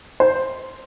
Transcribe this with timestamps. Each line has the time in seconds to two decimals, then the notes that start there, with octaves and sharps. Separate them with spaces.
0.20 C5